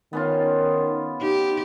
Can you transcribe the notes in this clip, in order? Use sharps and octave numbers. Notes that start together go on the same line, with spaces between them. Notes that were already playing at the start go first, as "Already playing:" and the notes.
D#3 B3 C#4 F4
D#4 G4